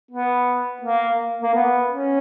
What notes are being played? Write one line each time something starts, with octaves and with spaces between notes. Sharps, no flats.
B3
A#3
A#3
B3
C#4